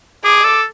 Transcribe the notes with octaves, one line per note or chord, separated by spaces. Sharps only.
G#4 D6
A4